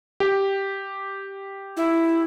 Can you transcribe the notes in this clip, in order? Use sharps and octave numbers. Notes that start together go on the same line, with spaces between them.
G4
E4